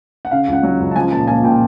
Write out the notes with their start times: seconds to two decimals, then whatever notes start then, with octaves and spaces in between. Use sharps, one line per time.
0.25 F#5
0.31 C#3 F5
0.48 C#2
0.53 F#5
0.63 F#3
0.80 C#2
0.91 A5
0.96 F3 G#5
1.11 A#2 A5
1.27 A#3 G#5
1.44 A#2 G5